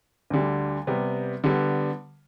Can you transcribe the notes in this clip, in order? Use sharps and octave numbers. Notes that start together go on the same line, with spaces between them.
D2 D3 G3
C3 G3 B3
D3 G3 B3